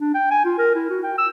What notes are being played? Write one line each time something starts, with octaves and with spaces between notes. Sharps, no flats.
D4
G5
G#5
F4
A#4
E4
F#4
G5
E6